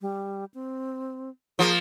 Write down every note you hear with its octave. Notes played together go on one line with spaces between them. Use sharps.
G3
C4
F3 A#3 G#4